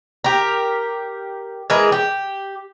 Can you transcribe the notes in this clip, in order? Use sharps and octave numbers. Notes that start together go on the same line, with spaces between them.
G4 A#4
E3 G#3 G#4 A#4
G4